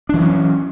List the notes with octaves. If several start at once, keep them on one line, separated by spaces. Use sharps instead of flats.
E3 F#3 C#4 D4